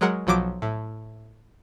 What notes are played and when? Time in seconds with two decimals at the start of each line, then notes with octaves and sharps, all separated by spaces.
0.01 F#3 G#3 A#4 F#5
0.27 B1 F3 F#3 D6 D7
0.62 A2